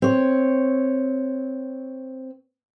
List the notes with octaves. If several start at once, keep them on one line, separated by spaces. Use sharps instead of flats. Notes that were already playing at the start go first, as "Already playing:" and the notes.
C4 C#5